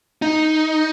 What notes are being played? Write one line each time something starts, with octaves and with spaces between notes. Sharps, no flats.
D#4